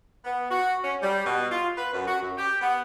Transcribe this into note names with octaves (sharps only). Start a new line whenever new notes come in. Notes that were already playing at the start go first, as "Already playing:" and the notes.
B3
F#4
C#4
G3
B2
F4
B4
F#2
F#4
F#2
G4
B3